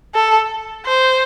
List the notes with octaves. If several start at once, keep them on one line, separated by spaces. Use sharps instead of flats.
A4
C5